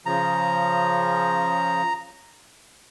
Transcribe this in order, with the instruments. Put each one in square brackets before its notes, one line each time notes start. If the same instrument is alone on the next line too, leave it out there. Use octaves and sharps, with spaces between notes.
[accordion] C#3 F3 [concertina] A#5